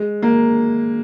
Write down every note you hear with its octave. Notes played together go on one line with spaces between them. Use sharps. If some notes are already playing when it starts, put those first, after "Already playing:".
Already playing: G#3
A#3